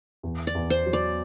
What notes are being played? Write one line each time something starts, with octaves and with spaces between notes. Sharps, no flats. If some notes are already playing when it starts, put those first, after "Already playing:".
E2
D5
E2
C5
F#3
D5